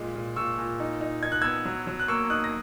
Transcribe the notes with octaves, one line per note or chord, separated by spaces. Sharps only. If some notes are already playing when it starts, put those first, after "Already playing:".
Already playing: A#2 G#3
A#2
A#2 C#6 E6
A#2
D#4
D#4
D#4 G#6
F#6
B3 E6 G#6
F#3
F#3
F#6
A#3 C#6 E6
D#4 D#6 F#6
A#6